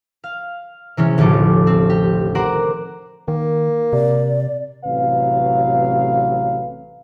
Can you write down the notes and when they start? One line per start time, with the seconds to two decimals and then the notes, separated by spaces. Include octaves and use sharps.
0.24 F5
0.97 C3 E3 G#3 C#4
1.18 D#1 A1 D3 F3 A4 D6
1.67 C4
1.90 G4
2.35 A#4 C5 D5 F#5
3.28 D#3 A#3
3.93 C3 D5
4.84 A1 C3 F#3 B4 F5